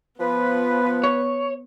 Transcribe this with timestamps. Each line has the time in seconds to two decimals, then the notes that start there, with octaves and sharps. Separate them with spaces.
0.19 F3 B3 B4
1.04 C#5